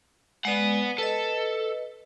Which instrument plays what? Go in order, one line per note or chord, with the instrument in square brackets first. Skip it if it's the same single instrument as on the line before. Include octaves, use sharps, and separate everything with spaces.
[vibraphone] G#3 D5 [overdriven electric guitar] B4 F#5
[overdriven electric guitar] A4 [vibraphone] B4 D#5